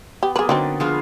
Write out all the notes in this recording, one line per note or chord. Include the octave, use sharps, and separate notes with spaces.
B3 G4
F#3 A#3 B3 G#4 B4
D3 F#3 C4 D#4 F#4 D5
F3 B3 D4 F4 G#4 F5